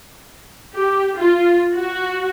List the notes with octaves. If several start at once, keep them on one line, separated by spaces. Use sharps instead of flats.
G4
F4
F#4